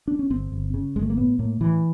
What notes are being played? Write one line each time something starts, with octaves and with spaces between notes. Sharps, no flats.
D4
C#4
G1 C4
G1
C#3
G1 G#3
A3
A#3
A2 B3
A2 A#3
A2 E3